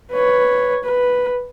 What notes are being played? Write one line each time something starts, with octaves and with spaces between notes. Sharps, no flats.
B4 C#5
B4